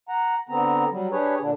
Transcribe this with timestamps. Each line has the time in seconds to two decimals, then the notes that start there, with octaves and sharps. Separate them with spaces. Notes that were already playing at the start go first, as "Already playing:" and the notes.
0.09 F#5 A#5
0.49 D3 B3 C4 A#5
0.92 F#3 G3
1.12 D4 G4 G#4 B4 C#5
1.40 A#2 D3 D4